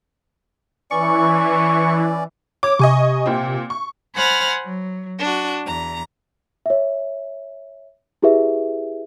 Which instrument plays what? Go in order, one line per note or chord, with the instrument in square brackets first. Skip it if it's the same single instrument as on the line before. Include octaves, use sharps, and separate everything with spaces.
[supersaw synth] E3 [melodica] C#4 D5 [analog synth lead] C#6
[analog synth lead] C#5 [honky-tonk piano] D6
[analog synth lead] C3 [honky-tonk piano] D#5 G#5 C#6
[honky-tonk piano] A#2 C4
C#6
[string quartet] C5 F#5 G#5 B5 F6 A6
F#3
D4 F#4
E2 A#5
[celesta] C#5 E5
E4 G4 G#4 B4 E5